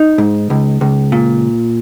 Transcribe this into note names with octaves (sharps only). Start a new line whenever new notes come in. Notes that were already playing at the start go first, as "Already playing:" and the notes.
Already playing: D#4
G#2
C#2
C#2
A#2